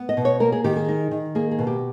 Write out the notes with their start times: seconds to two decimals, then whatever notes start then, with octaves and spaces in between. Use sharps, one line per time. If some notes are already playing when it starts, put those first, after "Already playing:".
Already playing: B3
0.09 D#5
0.17 B2
0.25 C#5
0.40 A#3 A#4
0.52 G#4
0.64 D#3 G4
0.76 G#4
0.88 D#4
1.11 D#3
1.35 A#3 G#4
1.51 G#4
1.59 B2
1.67 G4